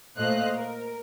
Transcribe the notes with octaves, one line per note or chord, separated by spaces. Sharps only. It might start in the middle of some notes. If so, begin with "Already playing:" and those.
A#2 A3 C5 D#5 F5 F#6
A#4